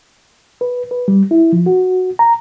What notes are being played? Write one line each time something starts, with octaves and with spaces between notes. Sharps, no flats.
B4
B4
G3
E4
F3
F#4
A#5